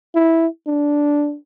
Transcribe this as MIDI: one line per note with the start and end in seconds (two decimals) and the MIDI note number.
0.15 0.47 64
0.67 1.36 62